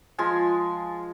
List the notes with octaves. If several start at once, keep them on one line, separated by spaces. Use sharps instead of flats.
F3 G#3 F4 G#5